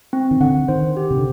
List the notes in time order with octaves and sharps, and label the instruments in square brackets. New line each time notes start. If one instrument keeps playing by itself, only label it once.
[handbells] C4
[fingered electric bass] D#3
[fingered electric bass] D3 [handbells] F#5
[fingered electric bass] D#3 [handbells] C5
[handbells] G4
[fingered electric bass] C3
D3